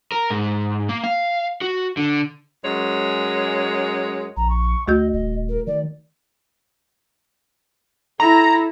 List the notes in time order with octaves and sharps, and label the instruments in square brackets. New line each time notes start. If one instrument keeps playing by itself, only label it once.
[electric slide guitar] A#4
G#2
A#3
F5
F#4
D3
[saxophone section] F#2 G#3 C#5
[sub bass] A#1 [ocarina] A#5
[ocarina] C#6
[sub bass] D2 [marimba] A3 F#4 G6 [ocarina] D#5
[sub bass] D#1 [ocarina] D#5
[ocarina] A#4
[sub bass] D#3 [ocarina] D5
[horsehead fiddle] E4 A4 [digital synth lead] A#5